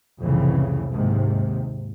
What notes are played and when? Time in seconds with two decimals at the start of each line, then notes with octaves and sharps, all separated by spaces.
0.21 C2 F2 A2 C#3 E3
0.90 D#2 G#2 C3